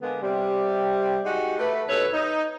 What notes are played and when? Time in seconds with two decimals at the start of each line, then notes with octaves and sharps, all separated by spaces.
0.02 D3 G#3 A#3 B3
0.21 C3 G3
1.24 G#3 D#4 F#4 G4
1.58 A3 B4
1.88 D#2 B2 A4 B4 C#5
2.13 D#4